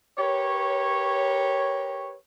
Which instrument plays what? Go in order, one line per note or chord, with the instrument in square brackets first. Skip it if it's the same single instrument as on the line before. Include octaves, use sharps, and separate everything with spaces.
[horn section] G4 A#4 B4 C#5